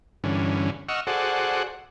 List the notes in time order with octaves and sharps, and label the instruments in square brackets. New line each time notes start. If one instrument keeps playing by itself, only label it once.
[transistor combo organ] G2 D3 E3 C#4
D#5 F#5 C#6 E6 F6
F#4 G#4 A4 C5 D5 F#5